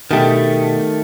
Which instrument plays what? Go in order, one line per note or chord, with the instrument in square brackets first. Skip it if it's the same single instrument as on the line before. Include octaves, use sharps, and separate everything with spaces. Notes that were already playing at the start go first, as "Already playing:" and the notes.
[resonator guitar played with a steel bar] B2 G4 [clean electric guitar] D#3 A3